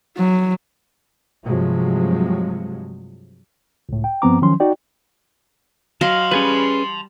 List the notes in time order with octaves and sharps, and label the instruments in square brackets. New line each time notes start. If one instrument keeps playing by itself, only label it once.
[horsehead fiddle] F#3
[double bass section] G2 C3 F3 F#3 G#3
[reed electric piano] C#2 A2
G5
G2 F3 B3 C4 A#5 D6
D#3 F3 F#3 C#4 C6
D#4 F#4 D5 G5
[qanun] F#3 D#5 F5 [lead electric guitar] A5 C6
[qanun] G3 [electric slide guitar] C#4 G#4 B4